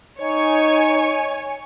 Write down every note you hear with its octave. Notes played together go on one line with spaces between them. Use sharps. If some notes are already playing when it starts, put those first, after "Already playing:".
D#4 C#5 G#5